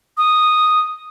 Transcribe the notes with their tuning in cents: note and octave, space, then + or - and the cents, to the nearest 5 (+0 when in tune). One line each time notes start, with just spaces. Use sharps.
D#6 -5